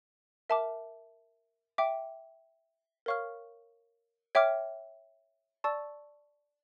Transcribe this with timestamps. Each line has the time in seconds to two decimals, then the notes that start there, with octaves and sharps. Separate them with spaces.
0.50 A#4 E5 A5 D6
1.78 E5 G5 D6
3.06 A#4 C#5 F5 C#6 F6
4.35 C#5 E5 G5 D6 F6
5.64 D5 A5 C#6 E6